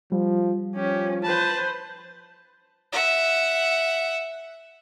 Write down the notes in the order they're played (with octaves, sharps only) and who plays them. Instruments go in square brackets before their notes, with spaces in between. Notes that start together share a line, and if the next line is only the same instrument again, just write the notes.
[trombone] F3 [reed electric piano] G3
[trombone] F3 [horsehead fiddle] C#4 [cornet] G4
[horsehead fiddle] B4 C5 [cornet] A5
[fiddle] E5 F#5